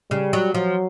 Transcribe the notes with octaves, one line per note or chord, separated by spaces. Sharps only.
C#3 G3
F#3
F3 F#3